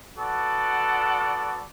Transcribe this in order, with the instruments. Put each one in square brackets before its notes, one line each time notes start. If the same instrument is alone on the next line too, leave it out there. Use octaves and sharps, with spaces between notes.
[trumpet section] B3 F#4 A4 D5 F#5